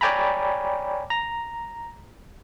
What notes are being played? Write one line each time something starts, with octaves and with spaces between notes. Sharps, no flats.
C#5 D5 G5 G#5 A#5 B5
A#5